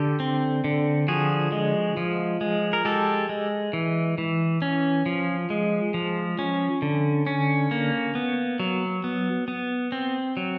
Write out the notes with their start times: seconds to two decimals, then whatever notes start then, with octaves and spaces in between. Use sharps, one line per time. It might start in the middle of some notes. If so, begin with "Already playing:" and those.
Already playing: D3 G4 A4
0.20 C4
0.64 D3
1.08 F3 F#4 G#4
1.52 G#3
1.97 F3
2.41 G#3
2.73 A#4
2.85 G#3 G4 A4
3.29 G#3
3.73 E3
4.18 E3
4.62 C#4
5.06 F3
5.50 G#3
5.94 F3
6.39 C#4
6.82 D3
7.27 C#4
7.71 A#3
8.15 B3
8.60 F#3
9.04 B3
9.48 B3
9.92 C4
10.37 F#3